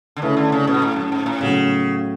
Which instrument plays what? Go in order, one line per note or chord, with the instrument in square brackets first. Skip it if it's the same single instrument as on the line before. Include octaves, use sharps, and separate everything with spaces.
[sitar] D3
[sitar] C#3 [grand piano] A3 E4 B4 E5
[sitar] D3
C#3
B2
G#2
A2
F#2
G#2
A2
[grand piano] A2 F#3 B3 [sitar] C#3